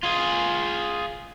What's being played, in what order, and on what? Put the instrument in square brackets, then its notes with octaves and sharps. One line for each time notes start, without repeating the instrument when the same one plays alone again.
[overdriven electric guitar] F4 G#4